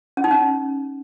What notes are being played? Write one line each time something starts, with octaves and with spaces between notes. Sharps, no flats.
C#4
D#4
C#4